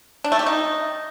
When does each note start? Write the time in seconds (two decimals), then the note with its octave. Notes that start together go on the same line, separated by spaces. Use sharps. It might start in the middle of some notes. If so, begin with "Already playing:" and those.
0.24 D4
0.32 A3
0.39 G4
0.46 D#4